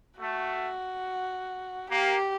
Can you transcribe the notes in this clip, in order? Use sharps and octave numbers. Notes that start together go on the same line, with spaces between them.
A3 F#4
A#3 G4